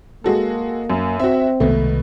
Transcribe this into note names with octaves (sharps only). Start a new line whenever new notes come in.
G#3 A#3 F#4 A4
F#2
C4 F#4 E5
C2 B2 D#3 G#3 A3